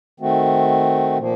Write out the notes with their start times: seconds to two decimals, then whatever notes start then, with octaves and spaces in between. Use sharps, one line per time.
0.20 D#3 A3 C4 F#4
1.17 A#2 F3 A#3